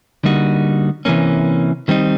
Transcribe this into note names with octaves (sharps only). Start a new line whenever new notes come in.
D3 G3 A#3 D#4 F#4
C3 E3 G3 A#3 C#4
D#3 G3 C4 D#4